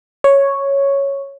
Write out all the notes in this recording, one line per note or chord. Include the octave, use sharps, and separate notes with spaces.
C#5